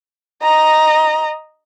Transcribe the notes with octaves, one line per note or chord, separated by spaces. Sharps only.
D#5 A#5